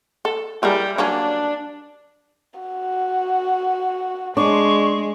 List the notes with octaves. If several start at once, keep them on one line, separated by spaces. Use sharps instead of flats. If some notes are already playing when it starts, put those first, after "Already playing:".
A4
G3 E4 G#4 A#4
F#3 A#3 C#4 D4
F#4
G#3 D4 C6 C#6